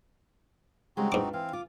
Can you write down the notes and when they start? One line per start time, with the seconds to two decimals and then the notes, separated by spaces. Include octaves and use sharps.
0.97 C#3 G3 G#3 C4 D#4 F#4
1.12 G#2 D4 F4 B4 D6
1.33 E3 C4 F5
1.53 F4 D6